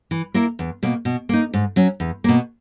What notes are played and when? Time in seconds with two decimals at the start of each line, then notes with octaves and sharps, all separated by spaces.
0.11 E3
0.34 A#3 E4 A#4
0.59 E2
0.83 B2 A#3
1.05 B2
1.29 A#3 D#4
1.53 G#2
1.76 F#3 C#4
2.00 E2
2.24 B2 A#3